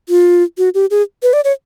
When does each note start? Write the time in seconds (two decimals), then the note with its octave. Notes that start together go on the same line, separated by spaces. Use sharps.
0.09 F4
0.58 F#4
0.74 G4
0.91 G#4
1.23 B4
1.33 D5
1.44 C#5